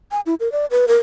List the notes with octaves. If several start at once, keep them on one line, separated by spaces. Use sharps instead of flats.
G#5
E4
A#4
D5
B4
A#4